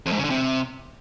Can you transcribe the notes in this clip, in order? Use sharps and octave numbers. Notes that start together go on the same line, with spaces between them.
F2
G#2
C#3
D3
C3